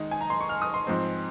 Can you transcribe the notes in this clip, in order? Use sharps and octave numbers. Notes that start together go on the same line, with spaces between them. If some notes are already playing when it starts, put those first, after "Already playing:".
Already playing: D#3 G#3 D#4
G#5
A#5
C6
C#6
F6
D#6
C6
G#2 F3 C4